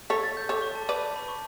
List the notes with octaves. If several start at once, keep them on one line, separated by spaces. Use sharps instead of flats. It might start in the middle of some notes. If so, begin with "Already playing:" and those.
A4 C#5 B6
A6
G6
A4 C#5 D6
C#6
A5
B4 D5 B5
A5
B5
C#6